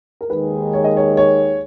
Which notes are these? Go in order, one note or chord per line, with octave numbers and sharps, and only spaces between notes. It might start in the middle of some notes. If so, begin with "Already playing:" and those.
A#4
D#2 D#3 G#3 D#4 G#4 B4
C#5
D#5
C#5
C#5